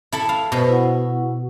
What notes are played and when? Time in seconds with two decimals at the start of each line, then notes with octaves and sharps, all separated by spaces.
0.12 E4 A4 E5
0.29 F5 B5
0.52 B2 B4 C5 B5
0.69 E4 F#5